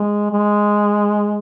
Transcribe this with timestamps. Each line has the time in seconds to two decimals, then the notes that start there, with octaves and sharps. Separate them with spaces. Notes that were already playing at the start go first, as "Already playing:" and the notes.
Already playing: G#3
0.31 G#3